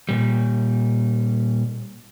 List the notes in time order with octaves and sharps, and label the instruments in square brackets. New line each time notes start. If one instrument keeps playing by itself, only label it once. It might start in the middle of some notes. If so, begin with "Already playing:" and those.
[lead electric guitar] A#2 G3